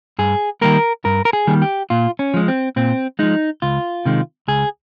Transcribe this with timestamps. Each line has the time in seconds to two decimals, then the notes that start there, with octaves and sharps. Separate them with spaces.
0.19 G2 G#4
0.61 D#3 G3 A#3 A#4
1.05 G2 A#4
1.25 A#4
1.33 G#4
1.47 D#3 G3 A#3
1.62 G4
1.90 A#2 F4
2.19 C#4
2.34 F3 G#3
2.48 C4
2.76 A#2 C4
3.19 F3 G#3 D#4
3.62 C#2 F4
4.05 C3 D#3 G#3
4.48 C#2 G#4